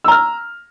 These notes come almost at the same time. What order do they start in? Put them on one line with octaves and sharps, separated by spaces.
E6 A#5 F6